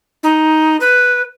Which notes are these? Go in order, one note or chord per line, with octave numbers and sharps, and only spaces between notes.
D#4
B4